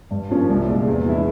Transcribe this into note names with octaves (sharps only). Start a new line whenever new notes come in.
G2
F3 A#3 C#4
C2
A#2 G#3
E2
E3 G#3 E4